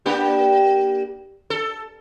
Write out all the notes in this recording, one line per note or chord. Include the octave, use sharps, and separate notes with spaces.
A#3 D4 G4
A4